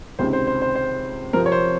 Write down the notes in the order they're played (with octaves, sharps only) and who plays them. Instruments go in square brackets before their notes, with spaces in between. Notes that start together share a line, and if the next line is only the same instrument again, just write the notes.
[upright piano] C#2 C3 D#3 [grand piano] C5
[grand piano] C5
C5
C5
C5
[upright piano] C3 F3 C4 [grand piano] A#4
[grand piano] C#5
C5